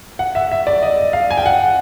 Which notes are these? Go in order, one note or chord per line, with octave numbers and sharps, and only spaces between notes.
F#5
E5
E5
D5
D#5
F5
G#5
G5
F#5